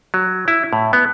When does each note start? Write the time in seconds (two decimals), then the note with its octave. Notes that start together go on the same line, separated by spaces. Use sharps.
0.14 F#3
0.48 E4
0.73 A2
0.93 B3